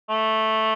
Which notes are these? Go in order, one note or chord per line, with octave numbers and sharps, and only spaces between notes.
A3